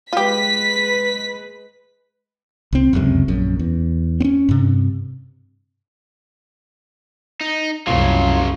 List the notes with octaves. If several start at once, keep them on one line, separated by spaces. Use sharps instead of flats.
G#3 F4 G4 B4 B6
C2 C4
F1 C#2 F#2 C3
A#1 F#2
E2
C4 C#4
G2 C3
D#4
C2 F#2 C#3 F#3 F4